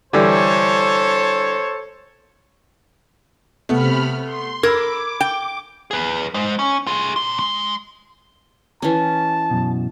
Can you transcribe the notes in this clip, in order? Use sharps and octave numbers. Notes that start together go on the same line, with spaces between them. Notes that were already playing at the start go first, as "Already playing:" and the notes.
D3 E3 G3 A4 C5 C#5
C3 A3 B3 B5 F6
C6
A#4 B5 D6 E6 G#6
G5
G#4 B4
G#3 C5
C#4
F4 G#4
A#2 C6
G#3 C6
E3 C#4 A5
F#2 B2